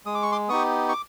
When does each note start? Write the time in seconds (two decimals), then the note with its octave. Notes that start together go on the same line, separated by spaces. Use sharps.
0.06 G#3 D#6
0.15 D6
0.23 C#6
0.32 C6 D6
0.49 B3 D#4 G4 C#6 D#6
0.89 C#6
0.93 D6